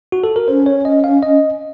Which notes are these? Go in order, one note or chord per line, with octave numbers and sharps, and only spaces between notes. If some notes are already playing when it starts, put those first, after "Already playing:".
F#4
A4
A#4
C#4 C5
C#5
D#5
F5
D#5